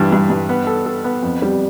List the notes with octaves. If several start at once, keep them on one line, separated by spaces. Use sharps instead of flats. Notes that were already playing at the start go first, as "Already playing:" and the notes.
Already playing: G2 E3
G2
G2
B3
A4
A4
B3
F2
G3